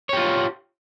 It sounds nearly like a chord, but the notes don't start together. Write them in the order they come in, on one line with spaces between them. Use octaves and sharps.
C#5 G4 F4